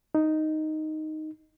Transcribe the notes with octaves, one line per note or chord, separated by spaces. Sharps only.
D#4